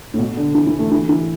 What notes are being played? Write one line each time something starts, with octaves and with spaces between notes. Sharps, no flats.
A2
B2
D3
E3
E3
A3
E3
E3